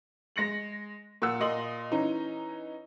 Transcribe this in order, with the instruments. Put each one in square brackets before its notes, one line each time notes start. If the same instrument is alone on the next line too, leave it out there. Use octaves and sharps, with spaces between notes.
[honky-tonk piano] G#3 A#6 C#7 F#7
A#2 F#5 E6
A#2 D#5 C6 F#7
E3 C#4 D#4